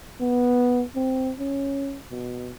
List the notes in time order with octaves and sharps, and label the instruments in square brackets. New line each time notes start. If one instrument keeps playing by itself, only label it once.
[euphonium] B3
C4
C#4
B2